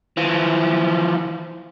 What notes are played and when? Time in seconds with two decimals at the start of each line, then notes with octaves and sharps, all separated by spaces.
0.17 E3 F3